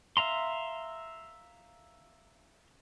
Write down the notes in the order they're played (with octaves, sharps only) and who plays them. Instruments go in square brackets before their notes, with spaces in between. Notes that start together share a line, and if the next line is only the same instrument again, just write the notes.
[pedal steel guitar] E5 F5 A#5 C6